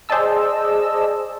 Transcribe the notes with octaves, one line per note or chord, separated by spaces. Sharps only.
G#4 C5 D5 D#5 A5 E6